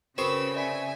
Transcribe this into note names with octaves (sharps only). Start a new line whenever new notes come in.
C#3 C4 F#4 A#4 B4 B5 C#6 E6
D5 E5 G#5 B5 B6